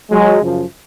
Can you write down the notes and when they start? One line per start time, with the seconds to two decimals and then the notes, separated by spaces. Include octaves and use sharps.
0.11 F#3 G#3
0.41 F#2 C#3 F3